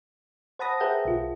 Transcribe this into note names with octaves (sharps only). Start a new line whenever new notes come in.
C5 F#5 A5 B5 D#6 A#6
G#4 A#4 B4 E5 F#5 G5
B1 F4